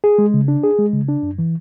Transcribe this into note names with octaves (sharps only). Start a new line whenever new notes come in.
G#4
G#3
C#3
D4
G#4
G#3
C#3
D4
F#2
E3